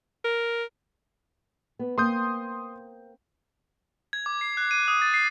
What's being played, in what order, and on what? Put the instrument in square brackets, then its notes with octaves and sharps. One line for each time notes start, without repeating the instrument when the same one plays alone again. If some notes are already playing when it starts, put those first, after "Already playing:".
[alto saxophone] A#4
[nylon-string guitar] B3
[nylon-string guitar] A#3 C4 [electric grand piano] C6 D#6 G6
[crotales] G#6
D6
C7
F#6
D#7
D#6
A6
C7